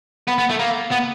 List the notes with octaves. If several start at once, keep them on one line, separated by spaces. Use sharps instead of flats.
B3
B3
A3
A#3
B3